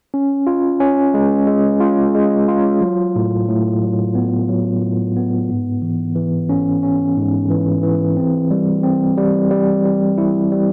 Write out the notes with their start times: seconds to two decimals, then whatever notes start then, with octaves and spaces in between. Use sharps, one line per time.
0.14 C#4
0.47 F4
0.80 C#4
1.14 G#3
1.47 G#3
1.81 F4
2.15 G#3
2.48 F4
2.81 F#3
3.16 A2
3.48 A2
3.82 F#3
4.15 B3
4.49 F#3
4.82 A2
5.16 B3
5.50 G#2
5.82 E3
6.16 E3
6.49 C#4
6.83 C#4
7.17 G#2
7.50 E3
7.83 E3
8.17 C4
8.51 G3
8.83 C4
9.17 G3
9.50 G3
9.85 G3
10.18 E4
10.52 G3